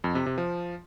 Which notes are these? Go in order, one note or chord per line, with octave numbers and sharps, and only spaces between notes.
F2
C3
C3
F3